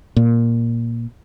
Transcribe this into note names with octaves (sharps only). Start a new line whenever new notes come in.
A#2